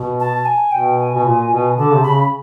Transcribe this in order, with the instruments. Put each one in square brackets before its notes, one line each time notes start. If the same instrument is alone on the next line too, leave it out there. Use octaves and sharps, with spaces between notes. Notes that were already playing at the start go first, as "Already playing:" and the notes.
Already playing: [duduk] B2
[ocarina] A5
G#5
[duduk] B2 [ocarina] G5
[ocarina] G#5
[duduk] B2
A#2
B2
[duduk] D3 [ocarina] A5
[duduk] C3
[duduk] C#3 [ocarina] B5